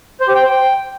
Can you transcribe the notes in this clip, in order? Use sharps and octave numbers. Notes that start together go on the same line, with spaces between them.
C5
G4
G5
C5
G5